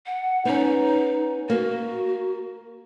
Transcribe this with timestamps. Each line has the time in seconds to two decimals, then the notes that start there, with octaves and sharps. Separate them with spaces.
0.06 F#5
0.45 B3 C#4 D#4
1.50 A#3 F#4